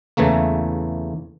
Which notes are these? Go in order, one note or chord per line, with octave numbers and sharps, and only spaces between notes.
E2 C#3 E3 A3 A#3